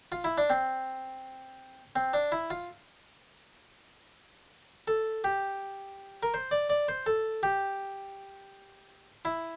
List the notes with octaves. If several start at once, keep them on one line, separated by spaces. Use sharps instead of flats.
F4
E4
D4
C4
C4
D4
E4
F4
A4
G4
A#4
C5
D5
D5
C5
A4
G4
E4